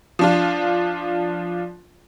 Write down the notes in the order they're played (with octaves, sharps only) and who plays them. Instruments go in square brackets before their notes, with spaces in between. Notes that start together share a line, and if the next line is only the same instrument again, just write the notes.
[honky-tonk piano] F3 D4 F4